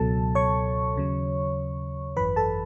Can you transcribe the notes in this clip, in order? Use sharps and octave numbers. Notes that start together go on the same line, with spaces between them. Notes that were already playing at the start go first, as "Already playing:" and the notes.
Already playing: C#2 B2 F#3 A4 A5
C#5 C#6
D#2 C#3 F#3
G#1 F#2 E3 B4 B5
A4 A5